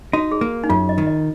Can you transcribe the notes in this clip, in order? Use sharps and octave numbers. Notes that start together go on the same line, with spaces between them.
D#4 F#4
G#4
A#3
D#4
F#2 F4
D#5
D#3
D#5